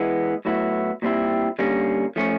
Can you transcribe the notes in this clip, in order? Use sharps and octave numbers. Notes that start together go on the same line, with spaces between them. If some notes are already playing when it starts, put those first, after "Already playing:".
Already playing: E3 G#3 B3
A2 F#3 B3 E4
A#2 G3 C4 E4
D3 G3 A#3 C#4
F3 A3 C#4